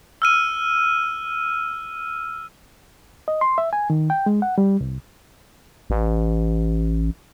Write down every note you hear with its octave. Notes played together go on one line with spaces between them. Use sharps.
E6 F6 D#7
D#5
C6
E5
G#5
D#3
G5
G#3
F#5
G3
C2
A1